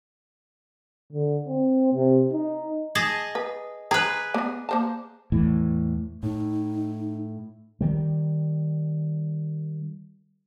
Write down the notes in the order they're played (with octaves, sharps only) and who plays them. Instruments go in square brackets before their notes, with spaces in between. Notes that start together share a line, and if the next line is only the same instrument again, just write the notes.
[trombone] D3
C4
C3
D#4
[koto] G#4 D#5 A5
[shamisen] B4
[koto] G#4 B4 [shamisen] C5 G5 A#5
[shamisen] A#3 B3
A#3 C5 A5
[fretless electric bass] E2 A2 E3
[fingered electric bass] A2 [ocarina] D#4
[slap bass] D#3 G3